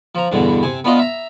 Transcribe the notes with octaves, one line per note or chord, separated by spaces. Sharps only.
F3 A#5
E2 G2 B2 D3
C3 G#5
B3 D4 F4 D#5
E5 A#5